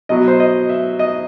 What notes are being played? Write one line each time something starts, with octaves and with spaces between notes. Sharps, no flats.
B2 F#3 D#5
C5
D#5
E5
D#5